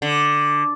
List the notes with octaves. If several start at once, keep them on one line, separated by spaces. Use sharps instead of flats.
D3